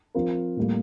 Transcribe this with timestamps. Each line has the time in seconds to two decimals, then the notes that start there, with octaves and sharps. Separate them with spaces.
0.15 F3 C4 F4 A#4
0.57 A2 G3 A#3